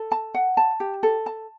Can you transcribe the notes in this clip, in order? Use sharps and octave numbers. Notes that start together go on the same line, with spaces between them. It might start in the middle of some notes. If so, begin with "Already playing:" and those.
Already playing: A4
A5
F#5
A5
G4
A4
A5